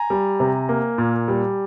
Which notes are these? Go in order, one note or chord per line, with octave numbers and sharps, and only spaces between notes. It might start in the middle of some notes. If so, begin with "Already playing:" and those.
Already playing: G#5 A#5
G3
C3
A#3
A#2
G3